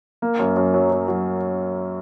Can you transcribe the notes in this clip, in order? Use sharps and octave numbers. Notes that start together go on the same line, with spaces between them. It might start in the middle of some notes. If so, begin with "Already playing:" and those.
A#3
F#2
F#2
F#3
F#3
F#3